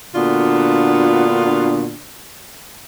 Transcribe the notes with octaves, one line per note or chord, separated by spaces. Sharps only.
A#2 D3 B3 D4 F4 F#4